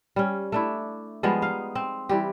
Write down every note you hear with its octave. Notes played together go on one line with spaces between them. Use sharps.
G3 C#4
A3 D4 E4
F3 G3 G#3 B3
D#4 F5
C4
E3 G3 G4